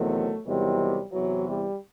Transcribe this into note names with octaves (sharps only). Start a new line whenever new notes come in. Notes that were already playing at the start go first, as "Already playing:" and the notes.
Already playing: E2 C3 D#3 F#3 A3
E2 C3 D#3 F#3 G3
E2 C3 E3 F#3
G3